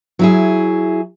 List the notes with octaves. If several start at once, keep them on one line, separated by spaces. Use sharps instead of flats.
F#3 E4 G#4